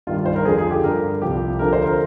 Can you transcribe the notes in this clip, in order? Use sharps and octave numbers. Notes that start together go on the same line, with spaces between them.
G2 D#3 G3 F4
C5
A#4
F2 D3 F3 G#4
G#4
G4
G2 D3 G3 A#4
C2 C3 F3 G4
D2 D3 F3 A#4
C5
A#4